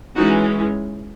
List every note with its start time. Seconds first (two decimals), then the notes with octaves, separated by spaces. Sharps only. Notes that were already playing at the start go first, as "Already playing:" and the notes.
0.16 E3 G#3 C#4 D#4 F#4